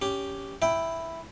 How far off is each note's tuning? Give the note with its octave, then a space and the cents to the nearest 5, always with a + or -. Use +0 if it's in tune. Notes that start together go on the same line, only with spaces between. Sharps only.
C#4 +20 G4 +0
E4 +0 E5 +0 G5 +0